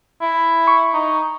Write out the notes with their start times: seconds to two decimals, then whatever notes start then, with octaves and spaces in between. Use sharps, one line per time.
0.21 E4
0.67 C#6
0.94 D#4